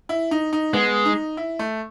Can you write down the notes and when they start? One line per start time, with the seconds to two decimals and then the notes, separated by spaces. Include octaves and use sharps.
0.09 E4
0.31 D#4
0.53 D#4
0.73 G#3 B3
1.05 D#4
1.37 E4
1.59 A3